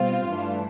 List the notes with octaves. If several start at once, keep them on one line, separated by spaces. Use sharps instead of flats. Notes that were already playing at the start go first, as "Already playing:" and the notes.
Already playing: B2 G3 C4 F4
G2 E3 A3 D4